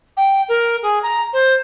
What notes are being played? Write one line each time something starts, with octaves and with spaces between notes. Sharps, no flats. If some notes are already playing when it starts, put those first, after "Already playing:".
G5
A#4
G#4
A#5
C5